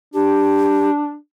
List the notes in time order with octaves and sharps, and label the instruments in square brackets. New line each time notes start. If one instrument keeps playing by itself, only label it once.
[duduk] D4 [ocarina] G4